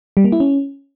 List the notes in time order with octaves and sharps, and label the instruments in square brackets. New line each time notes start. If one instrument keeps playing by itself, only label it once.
[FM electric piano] G3
A#3
E4
C#4